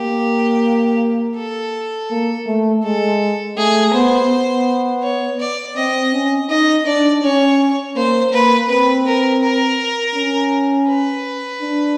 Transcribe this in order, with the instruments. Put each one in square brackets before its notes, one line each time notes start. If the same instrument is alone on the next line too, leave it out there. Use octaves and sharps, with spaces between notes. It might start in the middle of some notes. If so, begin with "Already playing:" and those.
Already playing: [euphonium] A#3 [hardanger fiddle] G4
[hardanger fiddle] A4
[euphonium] A#3
A3
[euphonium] G#3 [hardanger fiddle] A4
[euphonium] A3 [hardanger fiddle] G#4
[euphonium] B3 [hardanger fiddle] C5
[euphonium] B3
[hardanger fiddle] C#5
D5
[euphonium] C4 [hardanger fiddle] D#5
[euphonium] C#4
[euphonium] D#4 [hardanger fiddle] D#5
[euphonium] D4 [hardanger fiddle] D5
[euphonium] C#4 [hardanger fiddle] C#5
[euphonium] A#3 [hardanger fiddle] C5
[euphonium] A#3 [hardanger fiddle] B4
[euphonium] C4 [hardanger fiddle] B4
[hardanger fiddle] A#4
A#4
[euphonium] C#4
[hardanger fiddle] B4
[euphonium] D4